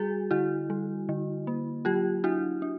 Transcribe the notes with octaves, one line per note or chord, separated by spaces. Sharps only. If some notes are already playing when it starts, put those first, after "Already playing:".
Already playing: G3 F#4 G#4
D3 E4 F#4
G3
D3
A#3
F#3 F4 G4
D4 E4 F#4
D4